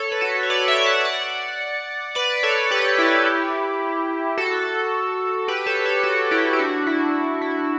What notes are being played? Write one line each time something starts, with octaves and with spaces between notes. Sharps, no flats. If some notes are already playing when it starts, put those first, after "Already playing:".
Already playing: A4 C#5
B4
F#4 A4
C#5
B4 D5
C#5 E5
D5 F#5
D5 F#5
B4 D5
A4 C#5
G4 B4
E4 G4
F#4 A4
G4 B4
A4 C#5
A4 C#5
F#4 A4
E4 G4
G4
D4 F#4
E4
E4